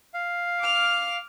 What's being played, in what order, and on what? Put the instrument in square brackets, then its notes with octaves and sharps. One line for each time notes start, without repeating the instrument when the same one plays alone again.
[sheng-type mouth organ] F5
[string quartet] D6 F6